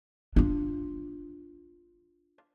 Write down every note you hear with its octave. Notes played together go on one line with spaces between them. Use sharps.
D4 F4